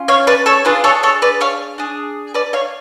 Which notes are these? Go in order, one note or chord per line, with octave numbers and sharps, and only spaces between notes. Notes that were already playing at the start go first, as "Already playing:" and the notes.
Already playing: C#4 F4
C#5 F5
B4 D5
A4 C#5
D4 F4 G#4 B4
A4 C#5
A4 C#5
B4 D5
C#5 F5
D4 G#4
B4 D5
C#5 F5